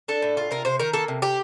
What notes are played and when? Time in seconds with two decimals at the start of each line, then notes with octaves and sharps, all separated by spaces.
0.08 D4 A4
0.22 A2
0.37 F4
0.51 C3 A#4
0.65 C3 C5
0.79 D#3 A#4
0.93 A#3 A4
1.08 C3
1.22 C3 G4